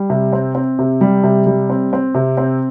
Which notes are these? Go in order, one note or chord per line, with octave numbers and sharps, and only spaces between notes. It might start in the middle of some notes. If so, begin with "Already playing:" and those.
Already playing: G3
C3
C4
C4
C3
G3
C3
G3
C4
C4
C3
C4